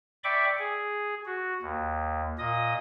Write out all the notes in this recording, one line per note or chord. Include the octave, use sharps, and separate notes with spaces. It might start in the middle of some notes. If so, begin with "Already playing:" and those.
D5 E5 G5 B5 C#6 D6
G#4
F#4
D#2
A#2 D#5 D#6